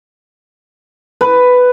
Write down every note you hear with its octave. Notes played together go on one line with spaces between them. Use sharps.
B4